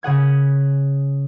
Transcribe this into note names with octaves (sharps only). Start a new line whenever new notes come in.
C#3 G#4 F#5 G#6